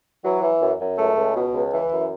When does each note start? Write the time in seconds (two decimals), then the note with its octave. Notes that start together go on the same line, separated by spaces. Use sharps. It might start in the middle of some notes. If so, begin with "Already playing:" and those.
0.24 E3 F#3
0.42 E3
0.61 F#2
0.79 F#2
0.98 C#2 A3
1.16 C#2
1.35 B2
1.54 C#2
1.72 E3
1.91 F#2